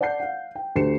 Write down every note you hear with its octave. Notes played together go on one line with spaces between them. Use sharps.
D5 F#5 A5 G6 C7
F5 F#5
G5
D2 G4 C7 C#7 E7